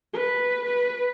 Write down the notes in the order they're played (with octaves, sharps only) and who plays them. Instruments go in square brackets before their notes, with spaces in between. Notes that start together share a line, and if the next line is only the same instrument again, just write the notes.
[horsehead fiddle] B4
B4